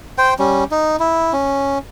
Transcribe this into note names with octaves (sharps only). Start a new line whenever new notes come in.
C5 G5
G3 C#4
D#4
E4
C#4